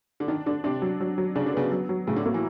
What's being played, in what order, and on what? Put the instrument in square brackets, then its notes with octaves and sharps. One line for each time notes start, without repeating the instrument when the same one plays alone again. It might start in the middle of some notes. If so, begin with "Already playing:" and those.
[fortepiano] D3
[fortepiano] D#3 [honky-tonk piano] D4
[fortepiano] D3 [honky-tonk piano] D4
[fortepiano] C3 [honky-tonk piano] D4
[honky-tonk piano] F#3
F#3
F#3
[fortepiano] C#3 [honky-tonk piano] D4
[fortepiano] D3
[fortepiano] C#3 [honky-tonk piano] B3
[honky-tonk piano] F#3
F#3
[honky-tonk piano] A2 [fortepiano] C#3
[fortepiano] D3
[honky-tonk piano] A#3
[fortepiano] E3